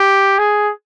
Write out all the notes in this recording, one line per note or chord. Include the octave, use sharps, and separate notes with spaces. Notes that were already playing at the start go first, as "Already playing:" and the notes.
Already playing: G4
G#4